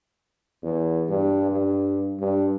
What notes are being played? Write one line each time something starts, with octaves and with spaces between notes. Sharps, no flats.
E2
G2
G2
G2